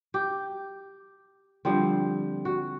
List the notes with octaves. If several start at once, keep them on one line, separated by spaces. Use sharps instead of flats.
G4
D3 F3 G3 C4
F#4